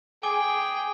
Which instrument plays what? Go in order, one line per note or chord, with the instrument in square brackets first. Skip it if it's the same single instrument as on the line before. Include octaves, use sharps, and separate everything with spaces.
[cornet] G#4 [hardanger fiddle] G5 [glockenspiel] G#5 D6 G7